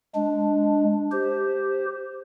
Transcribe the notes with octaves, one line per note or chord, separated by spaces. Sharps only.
G#3 D4
G4 C5